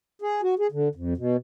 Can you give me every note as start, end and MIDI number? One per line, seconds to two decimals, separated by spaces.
0.22 0.41 68
0.43 0.55 66
0.59 0.67 68
0.72 0.89 50
0.95 1.14 41
1.17 1.37 47